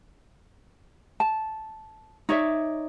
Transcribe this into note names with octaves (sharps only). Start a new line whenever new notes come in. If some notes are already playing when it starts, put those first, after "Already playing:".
A5
D#4 C#5 D5 E5